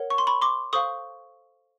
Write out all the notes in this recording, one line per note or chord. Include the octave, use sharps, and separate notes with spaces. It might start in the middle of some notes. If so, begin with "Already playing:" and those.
Already playing: A#4 C#5 F#5
C#6
C6
B5 C#6
C6 D6
A4 C5 F5 C#6 D#6